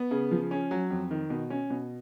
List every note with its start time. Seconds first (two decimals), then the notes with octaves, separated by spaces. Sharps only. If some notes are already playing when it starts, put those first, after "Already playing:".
Already playing: B3
0.11 C#3
0.31 F3
0.51 C#4
0.71 F#3
0.91 F2
1.11 D#3
1.30 B2
1.50 C#4
1.70 B2